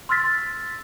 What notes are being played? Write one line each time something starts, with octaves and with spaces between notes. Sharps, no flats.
C6 E6 F6 A6 B6